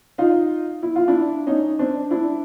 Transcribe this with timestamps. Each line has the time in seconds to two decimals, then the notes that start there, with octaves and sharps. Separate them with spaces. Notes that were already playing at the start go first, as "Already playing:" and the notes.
0.18 D#4 F4
0.83 E4
0.96 F4
1.08 D4 E4
1.47 C#4 D#4
1.79 C4 D4
2.11 D4 E4